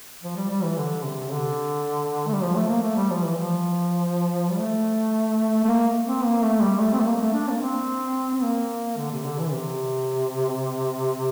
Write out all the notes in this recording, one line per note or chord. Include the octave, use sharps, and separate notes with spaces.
F3
G3
G3
E3
D3
C3
D3
A3
G3
F3
A3
A#3
A3
G3
F3
E3
F3
G3
A3
A3
A#3
C4
A#3
A3
G3
A3
C4
A3
A#3
A3
D4
A#3
C4
C4
A#3
D3
C3
D3
E3
C3